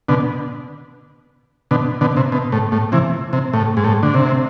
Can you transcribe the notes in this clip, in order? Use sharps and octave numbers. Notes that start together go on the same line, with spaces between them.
B2 D3
B2 D3
B2 D3
C3
B2
A2
A2
C3 E3
C3
A2
G#2
A2
D3
C3